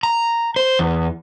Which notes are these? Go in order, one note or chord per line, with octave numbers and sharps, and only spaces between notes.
A#5
C5
E2